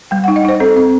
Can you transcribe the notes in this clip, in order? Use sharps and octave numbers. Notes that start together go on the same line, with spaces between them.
G3 G5
D#4 F#5
D#5
D#4 C5
C4 A4
C4